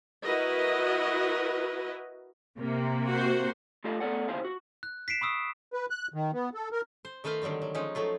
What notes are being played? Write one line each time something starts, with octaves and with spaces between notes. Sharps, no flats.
E4 F#4 A#4 B4 D#5
C3 A#3
F#4 C5
A3 F4 G4 A4 D#5 F5
A3 B3 A4 D5 F#5
D#2 C#3 E4 G4 C5 F5
F#4
F#6
B6 C7 D7 E7
B5 C#6 D#6 E6
B4
F#6
D#3
B3
A4
A#4
C5
D#3 A3 B4 C5 F5 A#5
D3 D#3 F#3 G3 C4
F#3
F3 G#3 C#4 D#4
F3 F#3 A3 F4